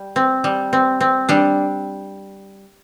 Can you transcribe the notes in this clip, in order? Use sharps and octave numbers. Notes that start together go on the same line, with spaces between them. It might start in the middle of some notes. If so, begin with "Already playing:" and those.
Already playing: G3
C4
G3
C4
C4
G3 D4